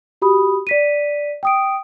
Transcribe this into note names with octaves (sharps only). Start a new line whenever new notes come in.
F#4 G4 B5 D#6
D5 B6 D#7
G5 D#6 D7